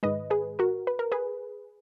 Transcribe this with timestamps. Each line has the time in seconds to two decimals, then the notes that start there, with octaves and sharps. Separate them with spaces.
0.03 G#2 D#3 G#3 B4 D#5
0.30 G#4 B4
0.59 F#4 A#4
0.87 B4
0.99 A#4
1.12 G#4 B4